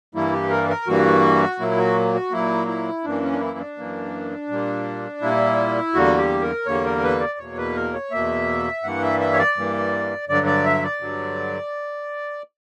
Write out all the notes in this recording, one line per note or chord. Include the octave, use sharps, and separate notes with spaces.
G2 E3 G3 A#3 E4
G4
A#4
A#4
G2 E3 G3 A#3 F#4
A#2 F#3 A#3 E4
F#4
F#4
A#2 F#3 A#3 E4
E4
F#2 E3 A#3 D4
C#4
D4
E4
D4
F#2 E3 A#3
A#2 G3 A#3
A#2 G3 A#3 E4
E2 D3 G3 A#3 F#4
G4
A#4
E2 D3 G3 A#3 C#5
A#4
B4
D5
E2 B2 A#3 C#5
B4
A#4
C#5
E2 B2 A#3 E5
G2 E3 G3 A#3 F#5
E5
E5
C#5
D5
G2 E3 G3 A#3
G2 D3 F#3 D5
D5
E5
D5
G2 D3 F#3